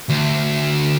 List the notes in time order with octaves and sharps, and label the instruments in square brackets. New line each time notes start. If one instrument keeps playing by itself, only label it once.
[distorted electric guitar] D2